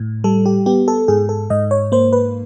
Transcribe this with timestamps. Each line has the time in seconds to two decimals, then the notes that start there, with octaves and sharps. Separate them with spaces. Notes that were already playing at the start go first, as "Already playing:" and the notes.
Already playing: A2
0.24 G3 A4
0.46 G4
0.66 B3 G4
0.88 A4
1.08 G#2 G#4
1.29 A4
1.50 G#2 D#5
1.71 C#5
1.92 A#3 C5
2.13 B4